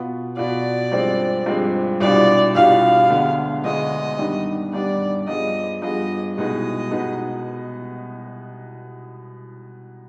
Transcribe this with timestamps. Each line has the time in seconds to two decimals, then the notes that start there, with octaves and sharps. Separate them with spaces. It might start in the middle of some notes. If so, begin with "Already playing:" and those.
Already playing: B2 B3 F4
0.37 B2 B3 F4 D5
0.92 G2 F3 G#3 C4
1.46 G2 F3 G#3 C4
2.00 C2 B2 G3 D4 F4 D5
2.55 C2 B2 G3 D4 F4 F5
3.10 D2 D3 G#3 B3
3.64 D2 D3 G#3 B3 D#5
4.18 G2 D#3 G3 B3 D4
4.73 G2 D#3 G3 B3 D4 D5
5.28 G2 F3 B3 F4 G#4 D#5
5.82 G2 F3 B3 F4 G#4 D#5
6.37 C2 B2 G#3 B3 D#4 D#5
6.91 B2 G#3 B3 D#4